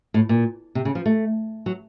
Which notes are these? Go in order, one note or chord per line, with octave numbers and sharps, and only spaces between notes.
A2
A#2
C3
C#3
F3
A3
F#3